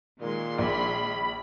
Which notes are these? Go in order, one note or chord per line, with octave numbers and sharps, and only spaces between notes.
A#2 D#3 G#3 C6
A#1 B5